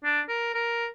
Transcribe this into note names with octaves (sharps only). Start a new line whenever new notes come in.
D4
A#4
A#4